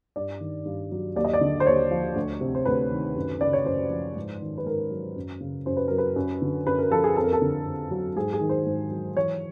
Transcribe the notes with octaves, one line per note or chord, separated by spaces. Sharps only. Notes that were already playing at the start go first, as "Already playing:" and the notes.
G2 D5
D#3
G2
F#3
D#2 D5
D#5
D5
D3
C5
D#2 C#5
F3
D2
C3
C5
D2 B4
D#3
F#2
C#3 D5
C#5
F#2 C5
F3
G#2
D#3
B4
G#2 A#4
F#3
F#2
C#3
F#2 C5
B4
F#3 A#4
B4
F#2
D3
F#2 B4
A#4
F3 A4
G#4
F2 A4
A#4
A4
D3
F2
F#3
G#2 G#4
G#4
D#3
C5
G#2
F#3
E3 C#5